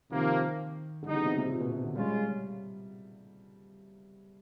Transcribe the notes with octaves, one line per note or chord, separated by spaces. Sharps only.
C3 D#3 F3 A#3
D3 E3 G3 B3 D#4
C#3
C3
C3
A#2
B2
C3
D3
G3 G#3 C#4 F4